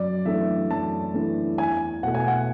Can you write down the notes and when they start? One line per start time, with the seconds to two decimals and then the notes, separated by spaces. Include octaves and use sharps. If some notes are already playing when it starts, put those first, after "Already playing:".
Already playing: F#2 D5
0.25 E3 A3 D4 E5
0.70 F#2 A5
1.14 E3 A3 D4
1.58 E2 G#5
2.03 B2 A3 F#5
2.14 G#5
2.28 F#5